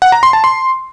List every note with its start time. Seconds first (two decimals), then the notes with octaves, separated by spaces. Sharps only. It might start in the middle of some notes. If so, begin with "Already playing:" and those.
0.02 F#5
0.12 A#5
0.23 C6
0.33 A5
0.44 C6